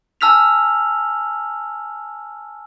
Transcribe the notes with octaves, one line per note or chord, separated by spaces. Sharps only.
G#5 A5 E6 F6 B6 F7